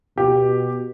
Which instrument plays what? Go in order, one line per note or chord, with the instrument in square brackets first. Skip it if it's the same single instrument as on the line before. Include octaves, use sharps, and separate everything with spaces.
[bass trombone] B2 [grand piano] G4